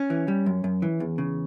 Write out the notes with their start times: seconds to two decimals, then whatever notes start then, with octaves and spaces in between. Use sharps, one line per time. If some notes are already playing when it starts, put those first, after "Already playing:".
Already playing: C#4
0.10 E3
0.28 G3
0.46 F#2
0.64 F#2
0.82 E3
1.00 E2
1.18 C#3